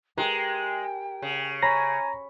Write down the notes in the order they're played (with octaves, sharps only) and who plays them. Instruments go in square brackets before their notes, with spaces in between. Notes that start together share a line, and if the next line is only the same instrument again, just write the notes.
[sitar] G#3 [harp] G4 A#4 [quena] G5
[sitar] C#3
[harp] C#5 B5 [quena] G#5 [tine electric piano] A#5 A#6